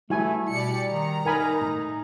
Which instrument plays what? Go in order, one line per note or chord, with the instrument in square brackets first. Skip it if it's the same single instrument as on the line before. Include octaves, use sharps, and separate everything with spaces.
[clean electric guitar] G3 [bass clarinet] A3 [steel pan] E4 F#4 G#5
[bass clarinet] B2 [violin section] G4 D5 C#7
[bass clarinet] D#3 [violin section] A#5
[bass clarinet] D#4 [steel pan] A#4 G#5 B5
[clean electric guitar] A2